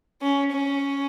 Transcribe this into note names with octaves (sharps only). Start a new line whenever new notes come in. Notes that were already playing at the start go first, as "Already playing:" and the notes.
C#4
C#4